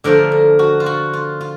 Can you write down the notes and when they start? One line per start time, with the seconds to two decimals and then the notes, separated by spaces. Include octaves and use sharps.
0.04 D3 F3 A3 A#4
0.32 A#4
0.59 F#4
0.80 F4
0.86 F#4
1.13 F4
1.41 F4